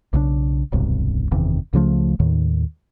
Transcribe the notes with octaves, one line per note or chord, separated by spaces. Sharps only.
B1 C#3 F3 D4
D1 B1 G2 C3
F#1 E2 C3 D#3
C#2 C#3 F3 A3
D#2 A2 D#3